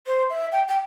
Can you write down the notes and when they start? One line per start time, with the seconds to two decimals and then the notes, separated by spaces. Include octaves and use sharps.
0.06 C5
0.29 E5
0.52 G5
0.68 G5